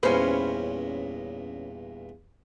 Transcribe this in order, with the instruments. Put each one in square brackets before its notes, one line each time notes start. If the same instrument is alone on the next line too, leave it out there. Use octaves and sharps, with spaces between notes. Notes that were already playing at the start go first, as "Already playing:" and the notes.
[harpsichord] E2 G2 A#2 [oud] C#4 B4 [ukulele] C5